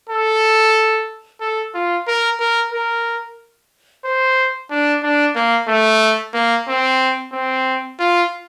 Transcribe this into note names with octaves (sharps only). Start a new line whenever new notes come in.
A4
A4
F4
A#4
A#4
A#4
C5
D4
D4
A#3
A3
A#3
C4
C4
F4